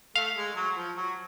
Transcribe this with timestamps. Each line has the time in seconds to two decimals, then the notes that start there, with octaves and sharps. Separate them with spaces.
0.16 A3 F5
0.36 G#3
0.56 F#3
0.77 F3
0.97 F#3